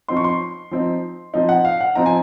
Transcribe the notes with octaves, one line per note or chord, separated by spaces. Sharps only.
F3 C4 D#4 C6
C#6
C6
F3 C4 D#4
F3 C4 D#4
F#5
F5
F#5
F3 C4 D#4 A#5
G#5